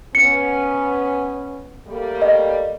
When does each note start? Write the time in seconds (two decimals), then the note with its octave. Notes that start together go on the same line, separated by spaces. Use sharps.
0.15 B3 C#4 C#7
1.86 G3 A3 A#3
2.22 D#5